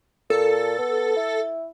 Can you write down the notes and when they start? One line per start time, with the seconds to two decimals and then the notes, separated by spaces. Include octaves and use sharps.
0.30 A#2 A4
0.79 B3
1.16 E4